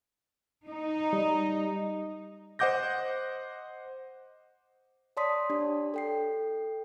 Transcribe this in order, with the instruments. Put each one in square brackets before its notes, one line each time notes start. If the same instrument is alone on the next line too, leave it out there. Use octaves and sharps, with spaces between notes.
[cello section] D#4
[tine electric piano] G3
[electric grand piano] C5 D#5 F#5 D6 G6 A#6
[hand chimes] C#5 D5 A5 C6 D#6 B6
D4 G4 D5
A4 G5 C7